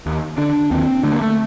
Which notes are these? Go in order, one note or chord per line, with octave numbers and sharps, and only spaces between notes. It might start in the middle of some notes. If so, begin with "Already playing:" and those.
D#2
D3 D4
D#2 C4
D3 A3
A#3
A3